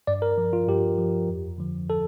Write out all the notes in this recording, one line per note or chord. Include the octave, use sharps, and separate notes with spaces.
G2 D5
A#4
F3
F4
G2 G4
F3
F2
D3 F3
A4